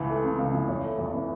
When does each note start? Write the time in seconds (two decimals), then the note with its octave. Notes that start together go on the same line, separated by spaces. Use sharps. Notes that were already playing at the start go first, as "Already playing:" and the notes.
Already playing: C#2 C#3 E3
0.10 A3
0.24 C#3
0.38 C#2
0.54 E3
0.68 E2 C#5
0.84 A3
0.98 E2
1.14 E3